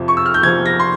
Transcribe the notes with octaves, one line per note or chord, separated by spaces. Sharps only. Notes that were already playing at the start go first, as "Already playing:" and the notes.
Already playing: F2 C3 F3
C#6
E6
F6
G6
F2 C3 F3 G#6
A#6
C6